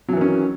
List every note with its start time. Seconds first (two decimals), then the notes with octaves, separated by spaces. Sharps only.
0.08 F#3
0.13 E3
0.17 D#3
0.21 C#4